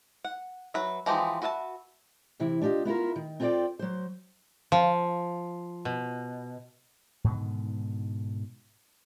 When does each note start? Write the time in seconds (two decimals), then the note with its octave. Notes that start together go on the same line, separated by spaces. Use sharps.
0.24 F#5
0.74 F#3 B4 E5
1.06 E3 F3 G#3 D#4 G4
1.42 F#4 B4 E5 F#5 A5
2.40 C3 E3 E4
2.62 D4 F4 G4 D5 D#5
2.85 B3 E4 F4 A#4
3.16 D#3
3.40 C4 F4 A4 C5 D5 G5
3.79 F#3 C5
4.72 F3
5.85 B2
7.24 G#2 B2 D3 D#3